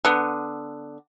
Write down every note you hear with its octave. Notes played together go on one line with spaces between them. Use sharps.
D3 B3